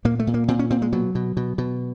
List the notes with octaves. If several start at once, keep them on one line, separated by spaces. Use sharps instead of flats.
A#2 A#3
A3
A#2
A#3
A#2 C4
C#4
A#2 C4
G#3
B2 F#3
B2
B2
B2